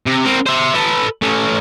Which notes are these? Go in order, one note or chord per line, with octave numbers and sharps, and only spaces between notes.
C3
C4 A#4
C5 E5
A4 B4
A3 C#4